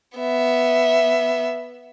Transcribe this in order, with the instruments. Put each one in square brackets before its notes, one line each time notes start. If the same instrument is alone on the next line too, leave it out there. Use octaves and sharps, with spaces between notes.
[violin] B3 E5